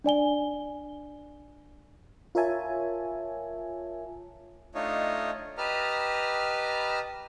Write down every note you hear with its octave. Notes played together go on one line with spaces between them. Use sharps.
D4 D5 G#5 G7
F4 A#4 C#5 E5 G#5 A5
A3 D4 D#4 F4 C#5 D#5
G4 B4 D#5 A5 A#5 F6